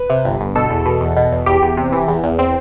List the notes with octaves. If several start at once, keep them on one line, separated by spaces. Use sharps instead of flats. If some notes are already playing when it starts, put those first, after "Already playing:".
Already playing: B4
C3
G1
G1
B2 A4
E2
B2
E2
B2
E2
E2 G4
E2
C3
E3
E2
E2
C4